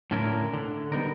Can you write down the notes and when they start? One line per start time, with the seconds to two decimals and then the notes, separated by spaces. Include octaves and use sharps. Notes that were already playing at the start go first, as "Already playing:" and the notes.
0.11 A2 D3 C#4 E4 A#4
0.54 D3
0.92 G3 B3 D#4 A#4